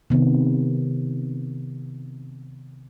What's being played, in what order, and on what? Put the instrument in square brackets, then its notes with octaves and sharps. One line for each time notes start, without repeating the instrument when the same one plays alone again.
[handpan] C3 D#3 B3